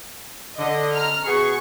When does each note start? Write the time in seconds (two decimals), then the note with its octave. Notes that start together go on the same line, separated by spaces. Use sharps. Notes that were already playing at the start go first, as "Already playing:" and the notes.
0.59 D3 D#5
0.94 A#5 F6
1.26 B2 B3 G#4 C#6